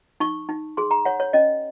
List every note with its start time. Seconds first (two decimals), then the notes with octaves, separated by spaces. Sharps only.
0.20 D#4 C#6
0.49 D#4
0.77 G#4 C6
0.91 A#5
1.05 C#5 F#5
1.20 C#5
1.33 C#4 D#5